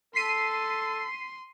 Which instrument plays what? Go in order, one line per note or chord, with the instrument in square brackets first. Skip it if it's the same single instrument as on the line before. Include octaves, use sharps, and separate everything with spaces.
[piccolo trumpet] A4 [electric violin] C6 [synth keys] B6 C7 D#7